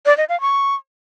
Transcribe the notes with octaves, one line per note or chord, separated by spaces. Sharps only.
D5
D#5
F5
C#6